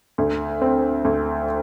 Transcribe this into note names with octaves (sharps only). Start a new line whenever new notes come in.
D2
C4
D2